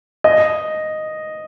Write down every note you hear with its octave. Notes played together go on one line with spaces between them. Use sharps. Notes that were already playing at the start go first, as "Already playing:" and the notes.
D#5